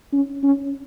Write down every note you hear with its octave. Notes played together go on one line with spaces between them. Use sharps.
C#4
C#4